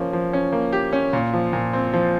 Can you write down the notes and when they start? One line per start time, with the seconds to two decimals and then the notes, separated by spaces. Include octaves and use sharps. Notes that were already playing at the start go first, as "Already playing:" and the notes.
Already playing: F3 A#3 C#4
0.13 F3
0.33 C#4
0.52 A#3
0.72 G4
0.93 C#4
1.13 A#2
1.33 F3
1.53 A#2
1.73 C4
1.93 F3